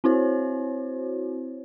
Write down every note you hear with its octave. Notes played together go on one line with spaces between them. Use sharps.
C4 E4 F#4 C5 C#5